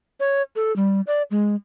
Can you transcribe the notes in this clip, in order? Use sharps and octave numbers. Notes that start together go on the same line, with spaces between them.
C#5
A4
G3
D5
G#3